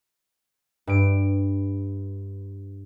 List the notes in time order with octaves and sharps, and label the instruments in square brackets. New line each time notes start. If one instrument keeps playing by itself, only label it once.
[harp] G2 D7